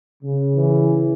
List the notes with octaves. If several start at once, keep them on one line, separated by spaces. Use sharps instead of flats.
C#3
E3